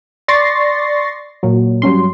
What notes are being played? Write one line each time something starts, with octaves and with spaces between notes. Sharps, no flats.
D5 C6 C#6 A6 A#6 C7
A#2 F#3
G2 F#3 C#4 C6